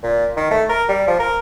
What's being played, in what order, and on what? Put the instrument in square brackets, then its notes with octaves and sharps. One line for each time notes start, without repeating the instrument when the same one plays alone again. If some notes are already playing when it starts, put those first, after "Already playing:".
[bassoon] A#2
D#3
A3
A#4
G3
F3
A#4